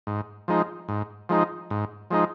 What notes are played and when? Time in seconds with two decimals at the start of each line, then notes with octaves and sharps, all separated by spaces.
0.07 G#2
0.48 F3 G#3 D#4
0.89 G#2
1.29 F3 G#3 D#4
1.70 G#2
2.11 F3 G#3 D#4